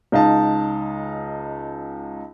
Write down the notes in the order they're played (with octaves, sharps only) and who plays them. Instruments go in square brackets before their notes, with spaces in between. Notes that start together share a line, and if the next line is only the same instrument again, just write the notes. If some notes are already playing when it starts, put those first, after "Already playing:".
[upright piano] C#2 D#4 F5 A5